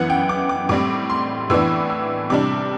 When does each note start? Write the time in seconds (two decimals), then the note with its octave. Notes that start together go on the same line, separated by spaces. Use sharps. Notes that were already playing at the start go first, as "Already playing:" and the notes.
Already playing: F#2 E3 B3 F#5
0.10 G5
0.29 D6
0.49 D6
0.69 A2 G3 C4 D6
1.10 C6
1.50 A2 E3 B3 D4 E6
1.90 E6
2.30 C3 G3 D4 D6